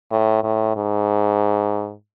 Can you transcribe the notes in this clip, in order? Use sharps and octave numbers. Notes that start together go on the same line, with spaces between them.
A2
A2
G#2